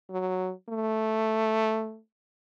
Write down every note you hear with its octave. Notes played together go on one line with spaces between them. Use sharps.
F#3
A3